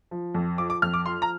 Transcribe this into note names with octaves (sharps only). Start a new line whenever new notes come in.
F3
F2
F3 D6
D6
F2 F6
D6
F3 C6
A#5